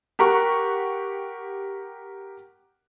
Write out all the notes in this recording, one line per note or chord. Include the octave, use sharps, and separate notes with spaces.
G4 A#4 F#5 C#6 F#6